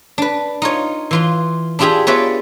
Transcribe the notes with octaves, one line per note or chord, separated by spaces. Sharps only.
D4 B4
D#4 F4 C#5
E3 F4 C6
D4 E4 F4 G4 G#4 E5
B3 F4 B4 C#5 D5 E5